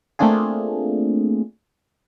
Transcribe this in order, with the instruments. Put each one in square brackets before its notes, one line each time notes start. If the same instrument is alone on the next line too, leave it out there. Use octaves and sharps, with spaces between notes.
[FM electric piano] A3 A#3 C4 D4 F4 G#4